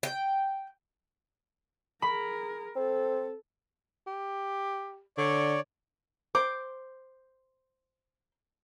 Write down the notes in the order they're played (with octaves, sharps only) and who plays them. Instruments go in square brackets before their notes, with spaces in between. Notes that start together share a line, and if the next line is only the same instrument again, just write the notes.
[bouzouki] G5
[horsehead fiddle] G#4 A#4 [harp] B5
[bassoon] C4 [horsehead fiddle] A4
[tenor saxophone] G4
[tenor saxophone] D3 [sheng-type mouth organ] C#5 D5
[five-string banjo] C5 [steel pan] D6